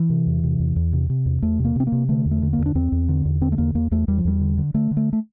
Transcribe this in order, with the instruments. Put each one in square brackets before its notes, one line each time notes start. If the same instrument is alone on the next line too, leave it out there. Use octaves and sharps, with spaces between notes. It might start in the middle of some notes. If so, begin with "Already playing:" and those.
Already playing: [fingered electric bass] E3
C3
E2
C3
E2
E2
C3
C3
E2
E2 A3
C3
A#3
C3 C4
A#3
C3
D3 A3
E2
A3
D3
A#3
E2
D4
E2 C4
E2
D3
E2
D3 C4
A3
E2 A#3
E2 A#3
E2 A3
E2 G3
F3
E2 G3
D3
D3
D3 A3
D3
A3
A3